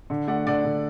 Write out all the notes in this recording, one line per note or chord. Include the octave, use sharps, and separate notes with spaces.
D3
A3 D5 F#5
D3 D5 F#5
D3